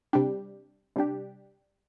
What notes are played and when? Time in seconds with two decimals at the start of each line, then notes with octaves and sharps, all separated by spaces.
0.13 C3 G3 D4 G4
0.96 C3 G3 D4 G4